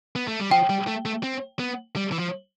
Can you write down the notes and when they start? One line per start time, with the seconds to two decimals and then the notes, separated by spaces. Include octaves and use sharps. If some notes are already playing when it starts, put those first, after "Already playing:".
0.16 B3
0.28 A3
0.40 G3
0.51 F3 G5
0.70 G3
0.88 A3
1.05 A3
1.23 C4
1.59 B3
1.96 G3
2.12 E3
2.19 F3